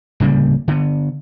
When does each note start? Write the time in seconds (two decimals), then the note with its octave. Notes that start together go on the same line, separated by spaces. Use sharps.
0.20 D1 C#3 G3 A#3
0.68 D3 B3